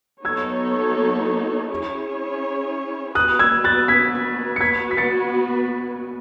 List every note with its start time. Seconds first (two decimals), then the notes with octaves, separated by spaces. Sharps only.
0.24 F#3 B3 D#4 A4 C#5 E6 G#6
1.70 C#4 E4 G#4 C#5
3.15 B3 F#4 B4 D#6 F#6
3.39 E6 G#6
3.64 F#6 A6
3.88 G#6 B6
4.56 C#7
4.61 B3 F#4 B4 G#6 B6
4.91 B6
4.97 A6 C#7